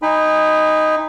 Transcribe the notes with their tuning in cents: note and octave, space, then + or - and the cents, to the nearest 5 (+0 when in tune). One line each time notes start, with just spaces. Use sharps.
D#4 +0 G#5 -40 B5 +10